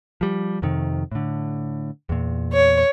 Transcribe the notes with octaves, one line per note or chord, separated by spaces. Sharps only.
F3 G3
F2 C3 D#3
A2 D3
E2 A#2
C#5